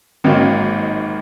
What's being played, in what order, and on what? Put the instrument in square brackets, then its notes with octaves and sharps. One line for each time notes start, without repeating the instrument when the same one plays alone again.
[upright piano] G#1 G#2 D#3 F#3 A#3